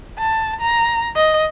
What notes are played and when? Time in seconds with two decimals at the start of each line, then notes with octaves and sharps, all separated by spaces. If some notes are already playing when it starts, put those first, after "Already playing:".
0.18 A5
0.61 A#5
1.16 D#5